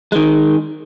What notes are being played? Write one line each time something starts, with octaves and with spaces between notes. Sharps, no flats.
D#3 G#3